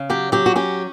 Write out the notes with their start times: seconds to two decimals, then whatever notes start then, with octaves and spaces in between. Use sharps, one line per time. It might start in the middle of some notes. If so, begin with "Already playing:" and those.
Already playing: C#3
0.10 F#3 G4
0.32 F#3 G4
0.46 F#4
0.56 C#4 G4